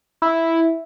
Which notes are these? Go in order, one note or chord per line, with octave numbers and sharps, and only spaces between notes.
E4